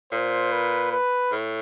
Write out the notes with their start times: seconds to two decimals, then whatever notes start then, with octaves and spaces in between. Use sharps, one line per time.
0.12 A#2 C5
0.52 B4
0.92 B4
1.32 A2